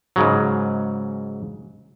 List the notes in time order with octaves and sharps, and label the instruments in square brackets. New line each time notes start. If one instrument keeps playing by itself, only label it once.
[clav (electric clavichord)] G#2 C#3 F#3